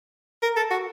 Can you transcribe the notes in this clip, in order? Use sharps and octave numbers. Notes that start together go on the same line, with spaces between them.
A#4
A4
F#4